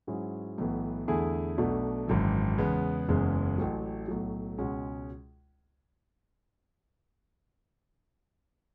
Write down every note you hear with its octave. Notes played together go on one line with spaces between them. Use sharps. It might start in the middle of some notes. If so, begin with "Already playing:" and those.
G#2 F#3 C#4 E4 G#4
B1 A2 E3 B3
E2 D3 A3 E4 G#4
B1 B2 A3 D4
G#1 F#2 E3
E2 C#3 G#3 B3
F#1 E2 C#3 E3 G#3
A1 A2 F#3
B1 A2 F#3
C#2 B2 G#3 C#4 F#4